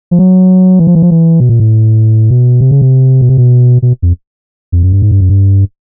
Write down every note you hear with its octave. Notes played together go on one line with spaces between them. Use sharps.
F3
F#3
E3
F3
E3
F3
E3
B2
A#2
A2
B2
C3
C#3
C3
B2
C3
B2
B2
F2
F2
F#2
G2
G#2
G2
F#2
G2